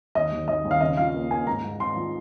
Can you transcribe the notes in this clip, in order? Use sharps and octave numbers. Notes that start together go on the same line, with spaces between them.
D#2 D#5
D#2
D#2 D#5
D#2
F5
C#3 D#5
F3 F5
A#3
A#3 G#5
G#2 A#5
G#2
G#2 C6
F3